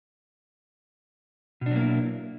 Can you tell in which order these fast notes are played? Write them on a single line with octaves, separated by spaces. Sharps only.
B2 D4 F#3 A#3 E4